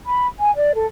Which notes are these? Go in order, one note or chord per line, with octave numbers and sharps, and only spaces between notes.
B5
G#5
D5
A4